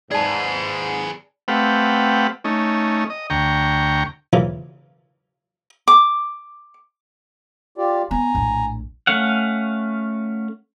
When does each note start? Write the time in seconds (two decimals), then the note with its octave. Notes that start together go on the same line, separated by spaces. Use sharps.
0.11 G#2 G#4 B4 D5 A5
1.48 A3 C4 G4 B4 F5 F#5
2.44 A3 C#4 D#4
3.10 D#5
3.30 D2 G5 A#5 C#6
4.33 C#3 E3 F3 A#3 E4 F4
5.88 D6
7.78 F4 G4 D5
8.11 B3 G#5 A#5
8.35 A#1 A2
9.07 A3 C#4 F5 F#5